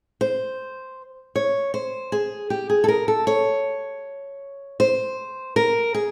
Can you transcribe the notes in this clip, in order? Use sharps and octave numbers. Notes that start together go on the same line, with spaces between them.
C5
C#5
C5
G#4
G4
G#4
A4
A#4
A4
C#5
C5
A#4
G#4